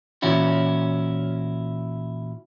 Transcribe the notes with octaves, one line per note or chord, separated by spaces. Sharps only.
A#2 E3 C#4 E4 F#4